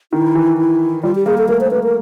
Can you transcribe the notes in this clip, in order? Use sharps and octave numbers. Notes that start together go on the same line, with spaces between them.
D#3 E4
E3
E4
G3 F4
G4
A#3 G#4
A4
A3 A#4
C5
A#3 B4
A#4